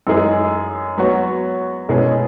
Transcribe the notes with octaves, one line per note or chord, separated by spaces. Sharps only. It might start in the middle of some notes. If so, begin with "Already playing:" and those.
F#2 E3 G#3 D#4 G#4
F#3 B3 F#4 C#5
B2 G#3 C#4 E4 G#4